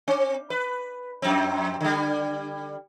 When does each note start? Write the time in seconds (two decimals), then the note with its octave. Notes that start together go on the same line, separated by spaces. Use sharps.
0.08 C4
0.50 B4
1.22 F2 C4
1.81 D3 G3